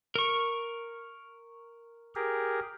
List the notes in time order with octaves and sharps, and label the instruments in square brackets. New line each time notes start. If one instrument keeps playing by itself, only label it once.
[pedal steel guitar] A#4 C#6
[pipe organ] G4 G#4 A#4